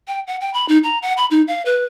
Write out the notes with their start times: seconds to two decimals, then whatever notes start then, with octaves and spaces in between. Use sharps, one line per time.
0.08 G5
0.27 F#5
0.41 G5
0.54 B5
0.69 D#4
0.83 A#5
1.02 F#5
1.17 B5
1.31 D#4
1.48 F5
1.66 B4